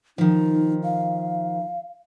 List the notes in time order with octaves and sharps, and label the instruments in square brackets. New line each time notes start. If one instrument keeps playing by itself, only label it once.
[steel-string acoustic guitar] D#3 F3 [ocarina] D#4
[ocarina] F5